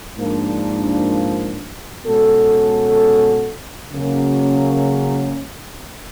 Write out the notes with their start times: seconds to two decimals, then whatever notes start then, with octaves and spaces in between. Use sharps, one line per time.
0.17 G#2 F3 A#3 D4
2.04 B2 G#3 C#4 F#4 A4
3.92 C#3 F#3 A#3 C#4